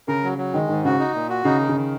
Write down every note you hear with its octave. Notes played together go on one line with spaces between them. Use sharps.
C#3 A#4
F#3
F#3
D#3 G#3
G#2 D#3
C#3 F#4
D#4
A#2
F#4
C#3 D#4
D#3
C#3
D#3